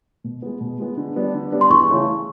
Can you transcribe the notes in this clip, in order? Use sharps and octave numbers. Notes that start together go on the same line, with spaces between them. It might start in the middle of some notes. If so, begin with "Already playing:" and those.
B2
G#3 B3
B2
G#3 B3
D3
G3 B3 D4
D3
G3 B3 D4
C6
E2 C#6
C#3 E3 A3 C#4